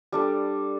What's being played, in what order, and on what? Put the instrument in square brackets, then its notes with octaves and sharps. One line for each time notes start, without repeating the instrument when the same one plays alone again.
[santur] G3 D4 A4